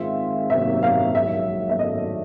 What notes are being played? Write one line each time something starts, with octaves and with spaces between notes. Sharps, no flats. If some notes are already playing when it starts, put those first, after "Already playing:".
Already playing: D#3 G#3 C4 F4 E5
C3 D#3 F#3 A#3 E5
F5
A#1 G#2 D#3 F#3 E5
E5
D#3 F#3 A3 D4 D#5